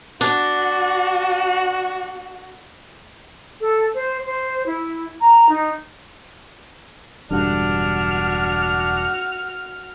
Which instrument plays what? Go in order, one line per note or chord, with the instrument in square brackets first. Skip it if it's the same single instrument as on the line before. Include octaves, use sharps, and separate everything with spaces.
[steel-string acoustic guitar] D4 [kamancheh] F#4
[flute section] A4
C5
C5
E4
A#5
D#4
[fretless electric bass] E1 G2 D3 [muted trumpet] D4 [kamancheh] F#4 F6